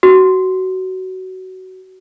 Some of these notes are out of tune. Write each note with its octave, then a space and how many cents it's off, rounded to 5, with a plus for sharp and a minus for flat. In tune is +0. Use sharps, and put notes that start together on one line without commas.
F#4 +20